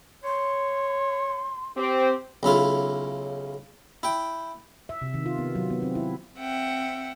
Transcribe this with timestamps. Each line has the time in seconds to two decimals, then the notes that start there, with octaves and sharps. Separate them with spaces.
0.24 C#5 C6
1.77 C4 G4
2.43 B1 C#3 E4 F4
4.03 E4 G5
4.89 E5
5.02 C3
5.14 D#3
5.26 F4
5.38 B3
5.55 F#3
5.70 B3
5.82 C4
5.95 E4
6.38 C4 E5 F#5 G5